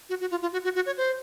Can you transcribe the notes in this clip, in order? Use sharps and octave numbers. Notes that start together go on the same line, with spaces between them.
F#4
F#4
F4
F4
F#4
F#4
F#4
C#5
C5